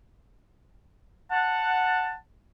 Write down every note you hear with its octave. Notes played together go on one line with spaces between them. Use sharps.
F#5 A5